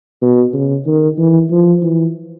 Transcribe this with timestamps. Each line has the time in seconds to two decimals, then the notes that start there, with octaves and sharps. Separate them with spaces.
0.21 B2
0.53 C#3
0.86 D#3
1.18 E3
1.51 F3
1.82 E3